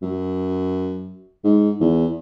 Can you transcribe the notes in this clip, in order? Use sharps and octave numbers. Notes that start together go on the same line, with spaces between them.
F#2
G#2
E2